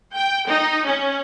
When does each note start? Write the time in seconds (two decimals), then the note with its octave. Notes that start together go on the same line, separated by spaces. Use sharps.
0.14 G5
0.48 D#4
0.86 C#4